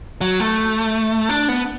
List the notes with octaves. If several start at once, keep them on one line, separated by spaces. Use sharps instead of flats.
F#3
A3
D4
B3